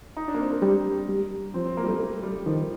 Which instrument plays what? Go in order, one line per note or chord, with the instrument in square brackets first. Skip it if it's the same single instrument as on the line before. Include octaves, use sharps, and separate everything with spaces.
[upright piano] D#4
D4
A#3
C4
A#3
[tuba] G3
G3
[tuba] F3 [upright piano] C4
[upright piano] C4
A#3
G3
A3
A3
G3
[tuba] D#3 [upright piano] F3